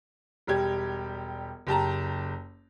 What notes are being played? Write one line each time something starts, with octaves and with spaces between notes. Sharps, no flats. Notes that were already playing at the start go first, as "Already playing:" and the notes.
E1 G3 G4 G#6
F#1 G4 A5 A#5